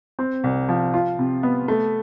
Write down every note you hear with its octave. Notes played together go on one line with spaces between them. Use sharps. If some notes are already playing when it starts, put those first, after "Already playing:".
C4
C2
F3
F4
C3
B3
A3